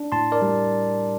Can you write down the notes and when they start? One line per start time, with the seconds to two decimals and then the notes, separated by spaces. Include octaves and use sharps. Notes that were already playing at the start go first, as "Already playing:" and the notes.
Already playing: D4
0.12 A2 A5 C6
0.32 A#4 D5
0.42 G3